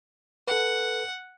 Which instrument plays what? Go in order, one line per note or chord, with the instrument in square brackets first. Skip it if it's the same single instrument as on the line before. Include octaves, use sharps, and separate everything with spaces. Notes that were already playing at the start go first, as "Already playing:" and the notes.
[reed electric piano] A4 B4 [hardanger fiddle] F#5